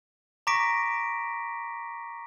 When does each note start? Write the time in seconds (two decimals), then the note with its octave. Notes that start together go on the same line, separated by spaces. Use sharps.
0.47 A#5 C#6 D6 A#6 B6 D7